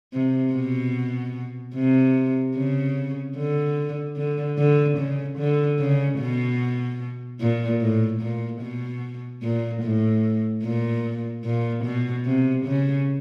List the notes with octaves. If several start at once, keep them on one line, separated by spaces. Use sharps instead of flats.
C3
B2
C3
C#3
D3
D3
D3
C#3
D3
C#3
B2
A#2
A2
A#2
B2
A#2
A2
A#2
A#2
B2
C3
C#3